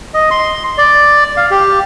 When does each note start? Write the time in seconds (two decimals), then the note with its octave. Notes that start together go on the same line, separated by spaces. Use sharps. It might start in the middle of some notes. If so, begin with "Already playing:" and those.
0.14 D#5
0.31 C6
0.78 D5
1.37 F5
1.51 G4